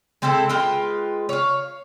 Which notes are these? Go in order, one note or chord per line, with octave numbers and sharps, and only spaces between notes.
G#3 C4 E4 A4
G#3 F4 B4 G5
C#5 F5